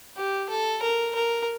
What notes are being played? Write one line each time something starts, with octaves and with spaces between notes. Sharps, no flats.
G4
A4
A#4
A#4